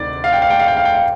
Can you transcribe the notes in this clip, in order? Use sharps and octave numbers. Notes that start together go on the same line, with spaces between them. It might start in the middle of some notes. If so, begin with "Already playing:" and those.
Already playing: D2 C3 D#3 D5
F5
G5
F5
G5
F5
G5
F5
G5
F5